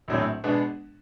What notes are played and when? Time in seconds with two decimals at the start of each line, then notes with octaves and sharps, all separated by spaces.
0.08 A#1 A2 F#3 A3 C4
0.44 B2 G#3 B3 D4